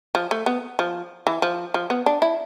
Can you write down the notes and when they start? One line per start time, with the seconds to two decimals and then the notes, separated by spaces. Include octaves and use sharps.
0.15 F3
0.31 A3
0.46 B3
0.79 F3
1.27 E3
1.42 F3
1.74 F3
1.90 B3
2.06 D4
2.22 E4